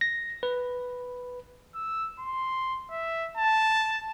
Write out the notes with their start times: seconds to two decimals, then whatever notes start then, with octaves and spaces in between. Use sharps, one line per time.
0.01 A#6
0.43 B4
1.75 E6
2.19 C6
2.91 E5
3.38 A5